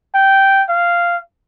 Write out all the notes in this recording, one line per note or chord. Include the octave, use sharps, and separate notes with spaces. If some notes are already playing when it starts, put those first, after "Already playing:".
G5
F5